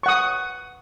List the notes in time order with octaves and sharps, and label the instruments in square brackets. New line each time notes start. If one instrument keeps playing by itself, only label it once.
[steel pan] C#6
F#5
D#6